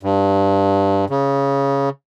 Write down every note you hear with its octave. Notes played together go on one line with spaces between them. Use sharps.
G2
C#3